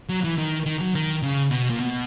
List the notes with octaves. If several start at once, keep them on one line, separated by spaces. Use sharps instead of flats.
F#3
E3
D#3
D#3
F#3
D#3
C#3
B2
A#2
B2